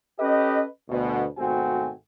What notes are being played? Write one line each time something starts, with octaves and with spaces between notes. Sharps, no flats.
C#4 G4 A4 B4 D#5
D2 B2
G#1 B2 A3 C4 F#4 G#5